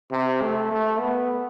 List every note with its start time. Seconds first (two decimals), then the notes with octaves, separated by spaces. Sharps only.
0.12 C3
0.42 A3
0.71 A3
1.00 B3